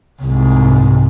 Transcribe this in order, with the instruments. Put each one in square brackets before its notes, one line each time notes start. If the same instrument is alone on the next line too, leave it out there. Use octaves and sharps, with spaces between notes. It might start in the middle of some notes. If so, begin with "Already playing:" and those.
[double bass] C2 G#2